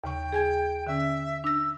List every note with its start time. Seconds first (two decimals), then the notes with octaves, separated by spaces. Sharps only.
0.04 D#2 C#3 G5 C#6
0.32 G#4 G#5 G#6
0.87 D3 C#4 E5
1.44 D4 E6 A#6